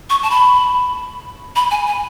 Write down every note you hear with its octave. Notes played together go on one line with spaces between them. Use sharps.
C#6
A5
B5
B5
G#5
G#5